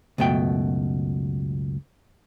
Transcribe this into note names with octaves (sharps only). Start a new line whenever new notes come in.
C#2 F#2 B2 A3 G5